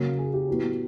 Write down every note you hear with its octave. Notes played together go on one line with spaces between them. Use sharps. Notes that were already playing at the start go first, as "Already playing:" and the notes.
Already playing: C#3 F#3 A#3
G#4
G4
A2 F#3 B3